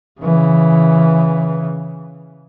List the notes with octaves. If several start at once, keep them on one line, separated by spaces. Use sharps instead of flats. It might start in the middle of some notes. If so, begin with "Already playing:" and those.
C#3 E3